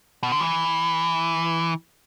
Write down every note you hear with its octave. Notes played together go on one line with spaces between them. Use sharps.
B2
D3
E3